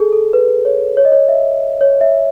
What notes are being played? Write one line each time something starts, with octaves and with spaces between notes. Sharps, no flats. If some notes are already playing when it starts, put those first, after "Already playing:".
Already playing: G#4 A4
A4
B4
C#5
C#5
D#5
C#5
E5
C#5
E5